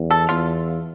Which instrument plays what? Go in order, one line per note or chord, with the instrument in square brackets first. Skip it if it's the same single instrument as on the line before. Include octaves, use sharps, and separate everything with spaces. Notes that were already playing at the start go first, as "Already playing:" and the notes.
Already playing: [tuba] E2
[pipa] A4
[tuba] E2 [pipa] F4